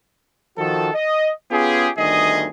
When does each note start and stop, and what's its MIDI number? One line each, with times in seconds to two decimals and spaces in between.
0.58 0.89 51
0.58 0.89 53
0.58 0.89 66
0.58 0.89 69
0.95 1.31 75
1.51 1.89 59
1.51 1.89 61
1.51 1.89 65
1.51 1.89 67
1.51 1.89 68
1.98 2.48 31
1.98 2.48 38
1.98 2.48 51
1.98 2.48 68
1.98 2.48 75